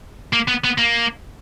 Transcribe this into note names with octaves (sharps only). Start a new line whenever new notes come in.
A#3
B3
B3
A#3